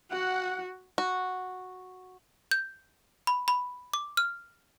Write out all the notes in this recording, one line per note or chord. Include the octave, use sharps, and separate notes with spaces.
F#4 F#5
F#4
G6
B5
B5
D6
F6